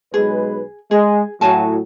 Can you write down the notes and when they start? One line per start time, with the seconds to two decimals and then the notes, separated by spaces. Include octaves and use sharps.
0.14 B1 G#3 G#4 B4
0.91 G#3 G#4
1.41 A2 F#3 F#4 G#5 A5